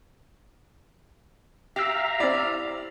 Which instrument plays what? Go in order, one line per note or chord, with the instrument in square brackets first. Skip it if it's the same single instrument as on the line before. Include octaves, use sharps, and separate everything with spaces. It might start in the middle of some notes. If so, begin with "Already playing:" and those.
[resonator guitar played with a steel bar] G4 [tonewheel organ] E5 F5 A#5 [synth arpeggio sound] E6 B6
[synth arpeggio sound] C4 E4 [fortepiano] D5